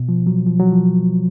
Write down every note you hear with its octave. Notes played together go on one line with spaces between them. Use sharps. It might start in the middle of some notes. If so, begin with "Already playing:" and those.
Already playing: B2
F3
F#3
F3
F#3
F3